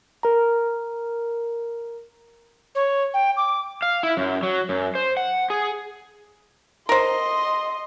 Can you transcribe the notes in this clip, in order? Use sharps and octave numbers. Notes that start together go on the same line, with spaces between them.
A#4 A#5
C#5
G5
D6
F5
E4
F#2
F#3
F#2
C5
F#5
G#4
A#4 C5 D#5 C6